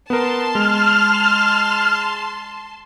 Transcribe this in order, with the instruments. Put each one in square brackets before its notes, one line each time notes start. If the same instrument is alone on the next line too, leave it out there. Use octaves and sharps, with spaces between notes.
[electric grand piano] B3 A#4 [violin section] A5 C6
[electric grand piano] G#3 [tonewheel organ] F6